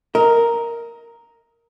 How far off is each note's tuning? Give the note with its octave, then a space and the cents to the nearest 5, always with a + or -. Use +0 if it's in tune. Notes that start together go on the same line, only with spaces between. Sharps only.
A#4 +0 D#5 +30